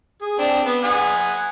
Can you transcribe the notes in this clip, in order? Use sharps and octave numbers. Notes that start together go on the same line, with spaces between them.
G#4
C4 D4
B3
F#5 G#5 D#6